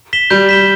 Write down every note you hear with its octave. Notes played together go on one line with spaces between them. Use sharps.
B6 E7 G7
G3 G6
B6 E7 G7